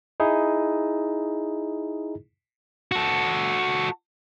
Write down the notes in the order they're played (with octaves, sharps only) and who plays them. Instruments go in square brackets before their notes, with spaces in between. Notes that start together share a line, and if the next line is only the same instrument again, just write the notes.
[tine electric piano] D#4 E4 G#4
[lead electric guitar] F#4 A4